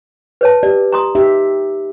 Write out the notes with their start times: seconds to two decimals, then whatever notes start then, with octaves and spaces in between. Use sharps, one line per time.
0.41 B4 C#5 A5
0.63 G4 D5
0.92 A#5 C6 D#6
1.15 D#4 G4 E5